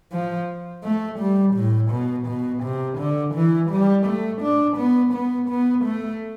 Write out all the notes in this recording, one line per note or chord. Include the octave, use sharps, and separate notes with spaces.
F3
A3
G3
A2
B2
B2
C3
D3
E3
G3
A3
D4
B3
B3
B3
A3